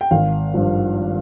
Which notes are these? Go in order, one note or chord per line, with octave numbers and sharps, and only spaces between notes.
G5
G#1 F5
G2 F3